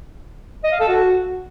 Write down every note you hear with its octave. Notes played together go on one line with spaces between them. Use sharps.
D#5
F5
A4
F#4